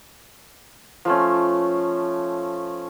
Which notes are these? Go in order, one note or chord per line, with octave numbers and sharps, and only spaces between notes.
F3 A3 C#4